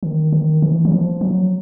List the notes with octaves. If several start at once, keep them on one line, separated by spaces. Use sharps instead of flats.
D#3
D#3
E3
F#3
F3
F#3